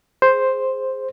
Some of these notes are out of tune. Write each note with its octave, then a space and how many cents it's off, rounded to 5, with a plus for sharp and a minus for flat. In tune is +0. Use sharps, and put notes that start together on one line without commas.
G#4 +0 C5 +0